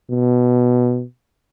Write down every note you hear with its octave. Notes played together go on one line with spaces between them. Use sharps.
B2